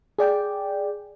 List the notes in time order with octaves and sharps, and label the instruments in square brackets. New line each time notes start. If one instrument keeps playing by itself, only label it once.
[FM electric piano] G#4 D5 G5